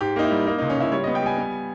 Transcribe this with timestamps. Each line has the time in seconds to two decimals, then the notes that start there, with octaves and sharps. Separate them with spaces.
0.01 G#2 G4
0.16 A#3 D#4
0.24 E4
0.31 G3
0.46 A#3 D#4
0.58 C#2 D#4
0.70 C#4
0.77 C#2 E4
0.92 G3 C#5
1.04 B3 D#5
1.15 G5
1.22 G3 G#5
1.38 B3